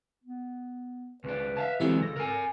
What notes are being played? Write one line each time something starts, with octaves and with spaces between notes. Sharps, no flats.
B3
C#2 D4 B4
E5 F5 A5
E3 F#3 G#3 C4 E4 G4 A4
C#2 A#6
A#4 G#5